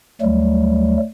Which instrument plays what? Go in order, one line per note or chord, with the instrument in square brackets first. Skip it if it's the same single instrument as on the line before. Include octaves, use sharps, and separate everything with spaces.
[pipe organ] D2 F#3 G3 A3